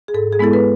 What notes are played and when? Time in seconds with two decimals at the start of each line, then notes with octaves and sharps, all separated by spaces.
0.08 G#4
0.14 G#2 A4
0.33 G#4
0.39 G#3 B3 E4 A4
0.53 B4